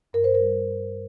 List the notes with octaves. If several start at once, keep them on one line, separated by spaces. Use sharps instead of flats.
G2 A#4
C5
A#4
G3
G2